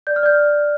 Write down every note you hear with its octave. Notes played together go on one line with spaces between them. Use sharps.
D5 G6
F6
D5 G6